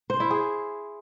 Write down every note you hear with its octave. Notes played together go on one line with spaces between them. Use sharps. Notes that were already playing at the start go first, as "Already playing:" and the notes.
C5
E4
G#4